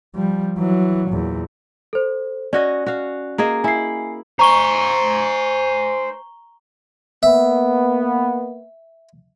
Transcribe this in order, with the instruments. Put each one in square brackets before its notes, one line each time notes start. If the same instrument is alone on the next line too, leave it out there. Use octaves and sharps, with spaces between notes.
[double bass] F3 G3
E3 F#3
E2 A#2
[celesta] A4 C5
[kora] C#4 F#4 D#5 [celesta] D5
[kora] F#4 F5
[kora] A#3 G#4 D#5 [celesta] A#5
[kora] E4 [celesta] G#5 C7
[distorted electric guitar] C5 G#5 [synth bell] A#5 C#6 G7
[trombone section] A#3 B3 [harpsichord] E5